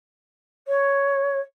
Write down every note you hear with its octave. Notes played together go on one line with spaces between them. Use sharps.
C#5